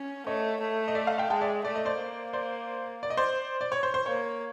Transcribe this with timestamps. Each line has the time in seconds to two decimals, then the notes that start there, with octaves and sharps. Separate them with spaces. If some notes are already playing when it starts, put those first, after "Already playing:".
Already playing: C#4
0.26 A3 C#5 D#5
0.61 A3
0.88 D#5
0.95 D5 E5
1.07 D#5 F5
1.18 F5 G5
1.30 G#3 G5 A5
1.41 D5 E5
1.65 A3 D5
1.75 D#5
1.85 C5 D5
2.00 A#3
2.33 C5 D5
3.03 D5
3.10 D#5
3.17 C5 D5
3.61 D5
3.72 C#5
3.83 C5
3.94 C5
4.06 A#3 C#5